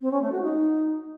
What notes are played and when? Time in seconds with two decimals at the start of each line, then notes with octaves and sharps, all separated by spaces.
0.01 C4
0.11 C#4
0.22 A3
0.32 F#4
0.42 D#4